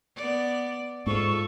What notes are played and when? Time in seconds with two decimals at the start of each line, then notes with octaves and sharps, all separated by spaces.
0.17 B3 D5
1.06 G#2 F4 A4 C#6